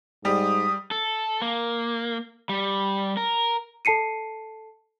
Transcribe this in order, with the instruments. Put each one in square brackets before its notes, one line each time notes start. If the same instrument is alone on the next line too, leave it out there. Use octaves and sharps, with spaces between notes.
[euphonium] G#2 [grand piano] G3 [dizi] D#6
[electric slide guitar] A4
A#3
G3
A#4
[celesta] A4 A5 C7 C#7 D#7